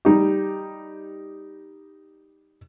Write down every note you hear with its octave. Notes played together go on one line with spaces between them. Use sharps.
G3 D#4 G4